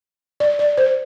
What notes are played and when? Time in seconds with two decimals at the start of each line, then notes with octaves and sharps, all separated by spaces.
0.40 D5
0.59 D5
0.77 C5